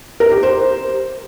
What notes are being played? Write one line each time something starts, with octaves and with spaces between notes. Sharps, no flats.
A#4
G4
C5